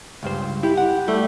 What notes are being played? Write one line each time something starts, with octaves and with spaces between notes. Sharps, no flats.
C#2 G2 C5
E4 G4
F#5
G3 A3